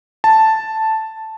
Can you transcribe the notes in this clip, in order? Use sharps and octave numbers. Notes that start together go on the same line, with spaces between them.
A5